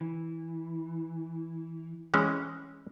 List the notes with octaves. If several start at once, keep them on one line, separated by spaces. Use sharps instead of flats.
E3
E3 G#3 C#4